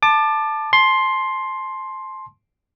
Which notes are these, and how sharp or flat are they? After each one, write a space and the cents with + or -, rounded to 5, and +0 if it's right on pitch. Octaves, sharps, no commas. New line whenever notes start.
A5 +0 D6 +25
A5 -30 C6 +10